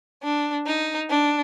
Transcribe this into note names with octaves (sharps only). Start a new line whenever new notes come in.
D4
D#4
D4